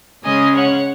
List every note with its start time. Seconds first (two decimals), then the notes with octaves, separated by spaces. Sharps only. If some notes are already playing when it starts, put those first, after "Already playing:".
0.24 C#3 G#3 C#4 D#5 G#5
0.55 C#5 F#5